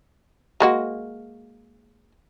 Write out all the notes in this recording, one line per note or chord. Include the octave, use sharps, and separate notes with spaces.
G#3 A#3 F#4